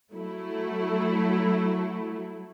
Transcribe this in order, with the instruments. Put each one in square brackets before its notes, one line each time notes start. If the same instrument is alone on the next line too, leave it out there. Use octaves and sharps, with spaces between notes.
[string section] F#3 A3 E4